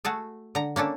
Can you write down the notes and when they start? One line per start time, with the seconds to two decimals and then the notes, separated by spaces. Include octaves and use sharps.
0.05 A3 F#4 G#4 A4
0.55 D3 A#5
0.76 A#3 C#4 D4 A4